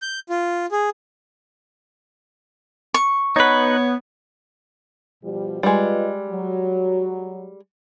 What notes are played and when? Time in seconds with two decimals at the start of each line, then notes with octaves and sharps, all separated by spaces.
0.02 G6
0.30 F4
0.72 G#4
2.94 C#6
3.36 B3 D#4 B4 C#5
5.23 B2 F3 G3
5.63 G3 G#3 F4 B4 D#5
6.30 F#3